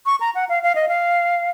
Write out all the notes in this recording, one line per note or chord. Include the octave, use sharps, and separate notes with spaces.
C#6
A#5
F#5
F5
F5
D#5
F5